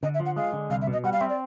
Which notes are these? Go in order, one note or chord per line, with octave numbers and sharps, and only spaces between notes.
D3 D#5
E5
F3
F#5
G#3 F5
D3
C2 F5
E5
B2
D#5
G3 F#5
F5
C4 E5
D5